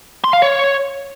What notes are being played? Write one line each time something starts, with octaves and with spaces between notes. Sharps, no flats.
C6
F5
C#5